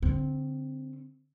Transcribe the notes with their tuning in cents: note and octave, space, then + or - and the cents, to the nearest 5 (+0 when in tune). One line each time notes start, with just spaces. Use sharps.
D3 -20 C4 +0